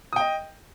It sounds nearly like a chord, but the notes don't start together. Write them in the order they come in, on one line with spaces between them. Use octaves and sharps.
D#6 G5 D#5